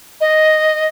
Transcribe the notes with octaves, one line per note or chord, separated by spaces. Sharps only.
D#5